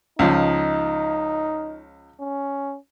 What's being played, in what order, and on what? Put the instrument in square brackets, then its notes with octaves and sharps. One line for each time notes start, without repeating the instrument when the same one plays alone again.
[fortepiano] C#2 F3 [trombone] D#4
[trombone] C#4